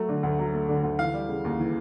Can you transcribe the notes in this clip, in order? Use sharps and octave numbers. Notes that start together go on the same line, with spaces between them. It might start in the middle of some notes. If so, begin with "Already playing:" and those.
Already playing: F#3 A3
D3
D2
F#3
A3
D3
D2
E3 F5
G3
C#3
D#2
E3